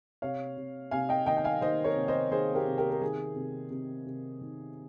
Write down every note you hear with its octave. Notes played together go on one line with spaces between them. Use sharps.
C3 C#5 F5
C3
C3 F5 G#5
D#5 G5
D#3 D#5 G5
G5
F5 G#5
D#3 C5 D#5
A#4 C#5
C3
C5 D#5
D#3 G#4 C5
G4 A#4
C3
G4 A#4
A#4
D#3 G#4
C3
C3
C3
D#3